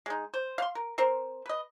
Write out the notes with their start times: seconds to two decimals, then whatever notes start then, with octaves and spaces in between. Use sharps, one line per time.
0.06 G#3 D#4
0.34 C5
0.58 F5 C6
0.75 A#4
0.98 C4 A#4 C5
1.46 B4 D#5